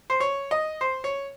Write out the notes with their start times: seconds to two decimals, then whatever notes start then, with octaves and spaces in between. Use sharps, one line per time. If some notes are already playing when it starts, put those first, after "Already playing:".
0.10 C5
0.20 C#5
0.51 D#5
0.81 C5
1.04 C#5